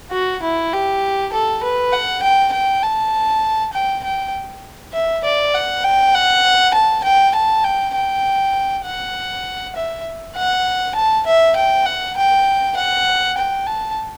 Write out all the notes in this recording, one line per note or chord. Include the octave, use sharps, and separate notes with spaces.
F#4
E4
G4
A4
B4
F#5
G5
G5
A5
G5
G5
E5
D5
F#5
G5
F#5
A5
G5
A5
G5
G5
F#5
E5
F#5
A5
E5
G5
F#5
G5
F#5
G5
A5